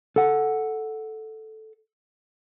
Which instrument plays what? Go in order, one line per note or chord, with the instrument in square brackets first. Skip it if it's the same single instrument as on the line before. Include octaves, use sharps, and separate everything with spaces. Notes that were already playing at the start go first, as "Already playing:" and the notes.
[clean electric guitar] A4 F#5